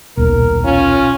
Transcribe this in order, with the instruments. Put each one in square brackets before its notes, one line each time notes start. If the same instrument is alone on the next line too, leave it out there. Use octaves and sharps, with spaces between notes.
[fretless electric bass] D#1 B1 [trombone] A#4
[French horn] C#4 [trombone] F4